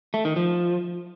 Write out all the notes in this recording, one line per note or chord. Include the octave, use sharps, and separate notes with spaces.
A3
D#3
F3